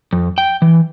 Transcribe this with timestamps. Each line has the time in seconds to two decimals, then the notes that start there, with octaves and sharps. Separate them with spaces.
0.13 F2
0.38 G5
0.62 E3